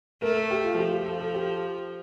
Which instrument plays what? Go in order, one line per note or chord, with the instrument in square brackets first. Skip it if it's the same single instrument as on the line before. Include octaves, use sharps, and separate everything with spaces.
[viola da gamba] A3 [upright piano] A#4
[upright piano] A4
G4
F4
[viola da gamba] F3 [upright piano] G4
[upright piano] G4
A4
A4
G4